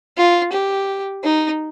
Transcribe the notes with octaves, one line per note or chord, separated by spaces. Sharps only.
F4
G4
D#4